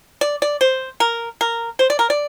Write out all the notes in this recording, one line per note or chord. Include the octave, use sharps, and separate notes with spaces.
D5
D5
C5
A#4
A#4
C5
D5
A#4
D5